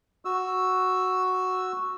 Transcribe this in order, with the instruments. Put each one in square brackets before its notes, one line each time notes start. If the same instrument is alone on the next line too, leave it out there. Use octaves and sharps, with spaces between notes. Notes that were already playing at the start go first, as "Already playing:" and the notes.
[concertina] F#4 E6